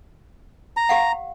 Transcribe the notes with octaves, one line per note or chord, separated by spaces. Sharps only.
A#5
G4 F5 F#5